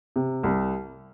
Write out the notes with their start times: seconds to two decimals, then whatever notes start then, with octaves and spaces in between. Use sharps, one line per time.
0.16 C3
0.43 C2